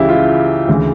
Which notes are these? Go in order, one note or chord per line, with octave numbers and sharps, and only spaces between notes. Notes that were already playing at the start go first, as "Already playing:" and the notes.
Already playing: C#2 C#3 E3 E4 G4
F4
D2 C#3 E3